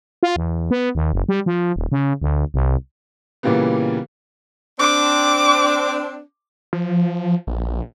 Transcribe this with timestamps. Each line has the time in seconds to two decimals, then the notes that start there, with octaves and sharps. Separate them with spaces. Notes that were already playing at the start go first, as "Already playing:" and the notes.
0.23 F4
0.36 E2
0.71 B3
0.95 D#2
1.13 F#1
1.29 G3
1.46 F3
1.76 D#1
1.92 C#3
2.22 D2
2.54 C2
3.43 A#2 C#3 E3 G3 A#3 B3
4.80 C4 D4 D6
6.73 F3
7.47 A#1